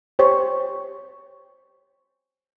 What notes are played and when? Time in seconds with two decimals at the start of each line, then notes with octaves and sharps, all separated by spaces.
0.19 G4 C5 C#5